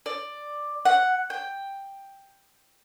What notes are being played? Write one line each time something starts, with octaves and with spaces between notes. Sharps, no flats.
D5
F#5
G5